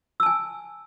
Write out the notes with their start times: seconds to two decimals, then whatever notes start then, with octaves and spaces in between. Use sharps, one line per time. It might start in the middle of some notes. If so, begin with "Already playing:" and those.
0.20 E6
0.23 A5
0.26 G#5